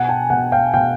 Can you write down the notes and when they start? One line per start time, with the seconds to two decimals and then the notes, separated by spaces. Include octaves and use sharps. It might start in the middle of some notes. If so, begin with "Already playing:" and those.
Already playing: B2 F#5 G#5
0.09 G5 A5
0.30 B2 F#5 G#5
0.52 F5 G5
0.74 B2 F5 G5